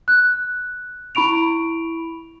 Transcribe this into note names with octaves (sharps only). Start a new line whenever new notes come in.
F#6
E4 B5 C#6 D7 F7